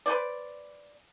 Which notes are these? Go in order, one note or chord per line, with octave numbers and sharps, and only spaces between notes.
B4 C5 D5